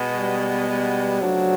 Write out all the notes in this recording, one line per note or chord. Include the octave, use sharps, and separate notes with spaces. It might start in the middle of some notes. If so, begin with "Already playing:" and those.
Already playing: B2 G#3 B3
G3
G3
C#3 F3 F#3 A3 D4